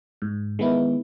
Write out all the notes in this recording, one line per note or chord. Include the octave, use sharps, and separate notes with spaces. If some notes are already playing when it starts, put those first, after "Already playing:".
G#2
D#3 G#3 B3 E4